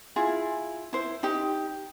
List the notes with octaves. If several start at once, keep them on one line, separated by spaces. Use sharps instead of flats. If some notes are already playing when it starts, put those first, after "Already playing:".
E4 F4 G#4
E4 C5
D#4 G4